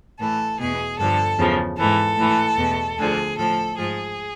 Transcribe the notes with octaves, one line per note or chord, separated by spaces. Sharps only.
A2 E3 A4
E2 B2 G#4
G2 D3 F3 A4
E2 C#3 F3
G#2 E3 A4
A2 E3
E2 B2
D2 D3 F3 G#4
A2 F3 A4
G#2 F3 G#4